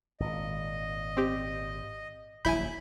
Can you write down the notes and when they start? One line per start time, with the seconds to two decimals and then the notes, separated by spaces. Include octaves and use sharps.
0.20 G#1 A#2 D#5
1.17 C4 G4
2.45 D#1 A#1 F#3 E4 G#5 B5 G6